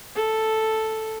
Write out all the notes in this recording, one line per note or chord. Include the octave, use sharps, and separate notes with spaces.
A4